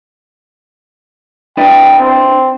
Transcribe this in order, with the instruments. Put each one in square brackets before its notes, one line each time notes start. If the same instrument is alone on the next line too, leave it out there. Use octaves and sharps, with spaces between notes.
[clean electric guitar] D4 E4 B4 [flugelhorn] G5
[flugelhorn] C4